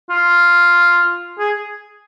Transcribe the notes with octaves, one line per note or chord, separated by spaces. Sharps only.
F4
G#4